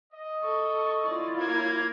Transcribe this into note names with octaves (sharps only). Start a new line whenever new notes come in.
D#5
A4 C#6
E4 F4 D5
A#3 C#5 G#6